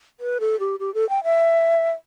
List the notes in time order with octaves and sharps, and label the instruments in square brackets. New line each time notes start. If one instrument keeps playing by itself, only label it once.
[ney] B4
A4
G4
G4
A4
G5
E5